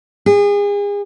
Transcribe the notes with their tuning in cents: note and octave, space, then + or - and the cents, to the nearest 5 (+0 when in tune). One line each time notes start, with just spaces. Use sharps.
G#4 -35